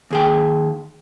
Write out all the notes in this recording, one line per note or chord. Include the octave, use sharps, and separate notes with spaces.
D#2 G#4 G5